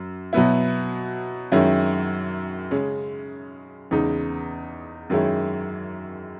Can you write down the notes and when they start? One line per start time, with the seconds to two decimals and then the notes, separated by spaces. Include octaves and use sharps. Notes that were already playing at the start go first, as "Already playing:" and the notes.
Already playing: F#2
0.33 B2 F#3 B3 E4
1.52 F#2 D#3 G#3 C#4 E4
2.71 C#3 G#3 C#4
3.91 E2 C#3 G#3 D#4
5.10 F#2 D#3 G#3 C#4 E4